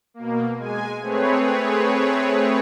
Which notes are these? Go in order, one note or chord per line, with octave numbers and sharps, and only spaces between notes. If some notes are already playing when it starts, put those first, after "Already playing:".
B2 A#3
G#3 G#5
A3 C4 G#4 B4 C#5